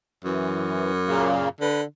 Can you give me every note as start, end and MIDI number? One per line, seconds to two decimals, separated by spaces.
0.25 1.50 42
0.25 0.92 52
1.08 1.49 46
1.08 1.49 49
1.08 1.49 58
1.61 1.83 50
1.61 1.81 71